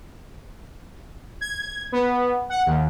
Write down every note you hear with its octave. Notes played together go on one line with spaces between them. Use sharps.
G#6
B3
F#5
D#2